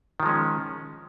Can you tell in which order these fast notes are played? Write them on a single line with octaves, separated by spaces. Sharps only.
D#3 F3 G#3 C#4